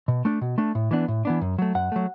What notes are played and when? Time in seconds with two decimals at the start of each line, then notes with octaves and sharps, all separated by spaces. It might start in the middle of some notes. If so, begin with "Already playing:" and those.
0.08 B2
0.25 A3 D4
0.41 B2
0.58 A3 D4
0.75 A2
0.91 E3 B3 D4
1.08 A2
1.25 E3 B3 D4
1.41 F#2
1.58 F#3 A3
1.75 F#2 F#5
1.92 F#3 A3